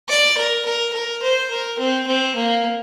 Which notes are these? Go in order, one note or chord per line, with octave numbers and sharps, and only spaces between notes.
D5
A#4
A#4
A#4
C5
A#4
C4
C4
A#3